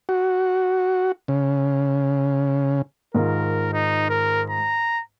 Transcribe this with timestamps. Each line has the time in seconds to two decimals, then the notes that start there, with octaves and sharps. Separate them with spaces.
0.09 F#4
1.28 C#3
3.15 G#2 D#3 F4 A#4
3.73 D#4
4.10 A#4
4.50 A#5